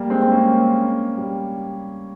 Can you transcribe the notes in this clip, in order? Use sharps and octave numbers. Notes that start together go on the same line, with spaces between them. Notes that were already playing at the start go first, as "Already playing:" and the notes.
Already playing: G3 A#3
G#3 C4
C4
A#3 C#4
G3